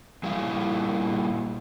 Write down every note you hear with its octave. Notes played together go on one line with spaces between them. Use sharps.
A#2 G3 E4 F5